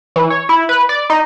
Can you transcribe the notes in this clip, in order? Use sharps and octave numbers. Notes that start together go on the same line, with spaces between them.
E3
C#5
E4
B4
D5
D#4